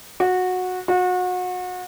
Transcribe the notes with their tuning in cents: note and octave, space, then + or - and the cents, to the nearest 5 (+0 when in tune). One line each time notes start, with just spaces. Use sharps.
F#4 -15
F#4 -30